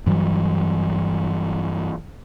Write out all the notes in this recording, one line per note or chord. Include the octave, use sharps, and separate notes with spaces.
G2 E3 F#3